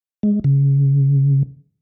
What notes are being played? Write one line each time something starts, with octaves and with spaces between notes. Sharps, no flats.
G#3
C#3